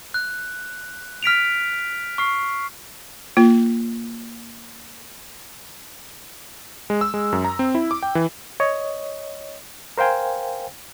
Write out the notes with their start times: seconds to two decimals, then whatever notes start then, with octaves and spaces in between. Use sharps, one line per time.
0.14 F#6
1.23 F6 B6 D7 F7
2.18 C#6 F6 C7
3.37 A#3 F4
6.90 G#3
7.01 E6
7.14 G#3
7.32 F#2
7.45 A#5
7.59 C4
7.75 E4
7.91 D6
8.03 G5
8.15 E3
8.60 C#5 D#5
9.98 A#4 C5 F5 G5 G#5